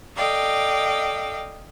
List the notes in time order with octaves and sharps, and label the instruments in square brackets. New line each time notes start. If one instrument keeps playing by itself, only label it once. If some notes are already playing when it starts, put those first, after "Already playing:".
[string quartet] A4 D5 D#5 F5 G5